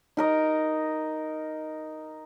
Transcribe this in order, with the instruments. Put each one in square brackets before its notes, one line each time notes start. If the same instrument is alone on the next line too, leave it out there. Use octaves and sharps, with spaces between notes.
[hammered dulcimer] D#4 A#4 D#5